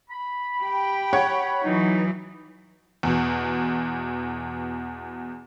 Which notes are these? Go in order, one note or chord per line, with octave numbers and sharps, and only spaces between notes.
B5
G4 G5
C#5 F#5 G#6
E3 F#3 D#4
E2 B2